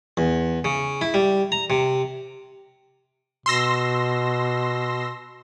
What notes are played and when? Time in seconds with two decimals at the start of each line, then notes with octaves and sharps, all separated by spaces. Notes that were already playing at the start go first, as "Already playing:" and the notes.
0.17 E2
0.65 C#3
1.01 E4
1.14 G3
1.52 A#5
1.70 C3
3.46 B2 C6 E6 A#6